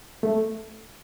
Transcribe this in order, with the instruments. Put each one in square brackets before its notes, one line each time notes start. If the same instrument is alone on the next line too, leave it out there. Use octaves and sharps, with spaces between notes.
[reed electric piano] A3